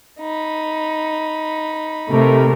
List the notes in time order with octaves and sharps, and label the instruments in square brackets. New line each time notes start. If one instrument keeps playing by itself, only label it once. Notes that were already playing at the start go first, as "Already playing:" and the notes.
[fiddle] D#4 B5
[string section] C3 A3 A#4